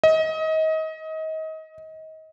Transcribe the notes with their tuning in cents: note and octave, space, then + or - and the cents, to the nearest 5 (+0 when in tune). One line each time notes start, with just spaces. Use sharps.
D#5 +30